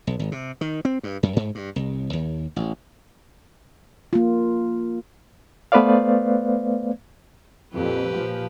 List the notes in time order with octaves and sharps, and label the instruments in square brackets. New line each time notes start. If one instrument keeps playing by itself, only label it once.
[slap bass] B1
G#1
C3
D#3
C4
G2
F#2
G#2
G2
C2
D#2
A1
[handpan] A#3 F4
[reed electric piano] A3 B3 B4 C5 D5 F5
[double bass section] F2 A#2 [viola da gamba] G4 B4
[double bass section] A#2 F3